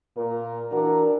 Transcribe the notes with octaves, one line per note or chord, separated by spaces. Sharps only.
A#2 A#4
E3 D4 F#4 A#4